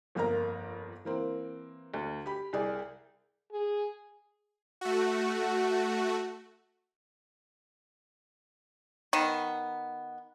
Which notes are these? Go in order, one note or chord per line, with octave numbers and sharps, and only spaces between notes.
G1 F2 A#3 A#4 A#5
E3 A#3 C4
D2
G4 B5
C2 G#4 D5
G#4
A3 F#4
D#3 B3